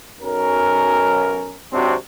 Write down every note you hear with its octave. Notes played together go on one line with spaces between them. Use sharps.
B1 C#4 A#4
G#1 C3 F#3 C4 D4 F#4